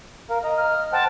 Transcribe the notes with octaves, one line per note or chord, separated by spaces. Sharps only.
A#4 F5
D#5 A#5
F6
C5 F#5 G5 A5